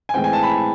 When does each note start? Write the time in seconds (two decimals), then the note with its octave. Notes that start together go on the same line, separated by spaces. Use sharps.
0.09 G#5
0.14 A2 E3 G#3 C4 G5
0.24 G#5
0.33 A5
0.43 B5